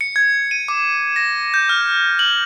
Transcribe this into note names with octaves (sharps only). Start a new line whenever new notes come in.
C#7
G#6
D#7
D6
A#6
G6
F6
F#7